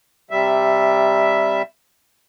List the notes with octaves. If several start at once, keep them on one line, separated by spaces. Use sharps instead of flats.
C3 G3 E5